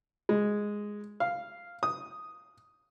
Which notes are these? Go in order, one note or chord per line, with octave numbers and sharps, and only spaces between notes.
G#3
F5
D#6